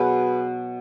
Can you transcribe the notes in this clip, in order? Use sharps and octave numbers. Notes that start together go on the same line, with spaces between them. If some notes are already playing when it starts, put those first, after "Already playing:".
Already playing: B2 F#3 B3 G#4 B4